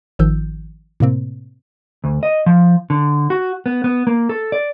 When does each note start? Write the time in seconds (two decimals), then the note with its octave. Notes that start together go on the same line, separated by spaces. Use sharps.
0.19 G#1 D#3 F3 E6 G6
1.00 A2 C3 A#3 C4
2.04 D2
2.23 D#5
2.46 F3
2.90 D3
3.30 F#4
3.66 B3
3.84 B3
4.07 A#3
4.29 A4
4.52 D5